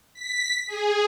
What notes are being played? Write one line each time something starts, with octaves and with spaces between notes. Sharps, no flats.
B6
G#4